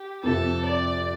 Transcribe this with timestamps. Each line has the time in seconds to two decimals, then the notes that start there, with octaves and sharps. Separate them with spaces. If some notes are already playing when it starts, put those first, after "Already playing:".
Already playing: G4
0.23 F2 C3 F3 A4
0.66 D5